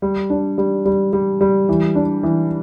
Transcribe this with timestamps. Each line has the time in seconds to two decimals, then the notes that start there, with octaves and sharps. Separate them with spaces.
0.02 G3
0.30 D4
0.58 G3
0.85 G3
1.13 G3
1.41 G3
1.69 E3
1.95 D4
2.23 E3